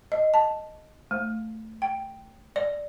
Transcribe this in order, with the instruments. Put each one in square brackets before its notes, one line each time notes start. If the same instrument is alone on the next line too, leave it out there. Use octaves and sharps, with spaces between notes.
[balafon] D#5
A5
A3
G5
D5